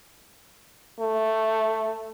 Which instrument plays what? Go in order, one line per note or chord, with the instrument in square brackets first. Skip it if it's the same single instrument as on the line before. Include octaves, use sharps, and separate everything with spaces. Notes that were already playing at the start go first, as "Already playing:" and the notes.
[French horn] A3